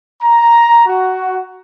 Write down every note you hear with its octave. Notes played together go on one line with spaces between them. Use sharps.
A#5
F#4